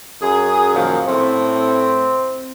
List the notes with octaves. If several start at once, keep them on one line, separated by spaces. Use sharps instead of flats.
F#2 G#4
A#2 D#3 F3
A2 A3 C4